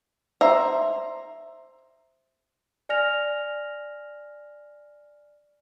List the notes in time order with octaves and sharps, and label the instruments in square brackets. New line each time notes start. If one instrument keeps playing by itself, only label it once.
[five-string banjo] C5 E5 A#5
[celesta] D5 G#5 F6 A#6 F7